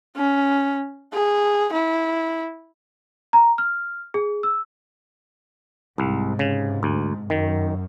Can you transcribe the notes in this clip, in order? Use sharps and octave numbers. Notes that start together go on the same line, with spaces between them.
C#4
G#4
E4
A#5
F6
G#4
E6
C2 G#2 C3
C#3
D2
F#2 D#3